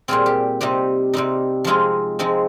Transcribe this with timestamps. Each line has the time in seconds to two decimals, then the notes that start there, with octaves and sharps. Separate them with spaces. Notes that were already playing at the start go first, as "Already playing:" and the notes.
0.08 A#2 G3 C4 F4 G#4
0.26 G4
0.61 C3 G3 C4 D#4 G4
1.13 C3 G3 C4 D#4
1.64 F3 G#3 C4 D#4 F4 G#4
2.19 F3 G#3 C4 D#4